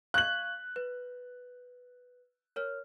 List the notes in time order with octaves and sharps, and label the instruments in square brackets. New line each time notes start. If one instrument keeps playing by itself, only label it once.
[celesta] F5 C#6 G#6 [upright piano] F#6 F#7
[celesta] B4
A#4 C#5 F6